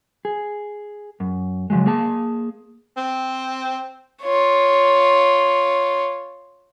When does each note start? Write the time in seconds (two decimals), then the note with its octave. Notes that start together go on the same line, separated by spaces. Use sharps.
0.25 G#4
1.20 F#2
1.70 C#3 F3 F#3 G#3
1.86 A#3 G#4 A5
2.97 C4
4.22 F4 C#5